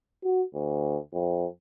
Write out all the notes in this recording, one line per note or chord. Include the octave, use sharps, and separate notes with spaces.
F#4
D2
F2